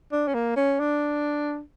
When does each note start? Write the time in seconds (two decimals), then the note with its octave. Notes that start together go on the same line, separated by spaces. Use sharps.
0.12 D4
0.27 C#4
0.34 A#3
0.56 C#4
0.80 D4